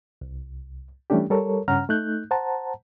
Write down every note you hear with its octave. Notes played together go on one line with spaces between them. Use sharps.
C2
E3 G3 A3 C#4 D4 G4
G3 A4 A#4 C#5
G2 C#3 C#4 F#5 A#5 F6
A3 D#4 F#6 G6
C5 F#5 A5 A#5